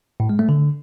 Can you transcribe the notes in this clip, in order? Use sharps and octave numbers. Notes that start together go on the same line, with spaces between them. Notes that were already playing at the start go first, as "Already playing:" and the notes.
A2
G#3
A3
D3